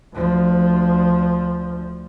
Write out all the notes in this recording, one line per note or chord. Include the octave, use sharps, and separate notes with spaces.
D2 F3